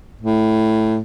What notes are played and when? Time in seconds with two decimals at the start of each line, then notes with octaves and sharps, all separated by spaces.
0.21 A2